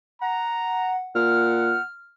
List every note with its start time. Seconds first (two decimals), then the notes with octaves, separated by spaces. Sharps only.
0.21 F#5 A#5
1.15 A#2 F#5 F6